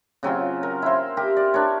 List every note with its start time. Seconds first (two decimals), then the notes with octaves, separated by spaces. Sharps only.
0.23 C#3 F#3 C4 F4
0.63 A#4
0.82 E4 C5
1.17 G4 A#4
1.37 D5
1.54 D4 A#4 C#5